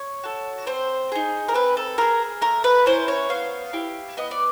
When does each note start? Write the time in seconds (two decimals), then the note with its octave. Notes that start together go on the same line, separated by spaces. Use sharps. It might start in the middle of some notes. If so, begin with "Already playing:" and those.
Already playing: C#5
0.24 F#4 A4
0.67 C4 C5
1.12 D#4 G#4
1.48 A#4
1.54 C4 B4
1.77 A4
1.98 F4 G#4 A#4
2.42 A3 A#4
2.64 B4
2.86 C#4 E4 C5
3.08 C#5
3.29 B3 F5
3.73 E4 G4
4.17 B3 D#5
4.31 D5